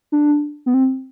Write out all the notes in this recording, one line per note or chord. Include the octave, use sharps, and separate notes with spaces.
D4
B3
C4